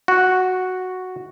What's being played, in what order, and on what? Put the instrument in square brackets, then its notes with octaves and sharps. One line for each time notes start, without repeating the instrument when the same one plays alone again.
[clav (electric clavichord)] F#4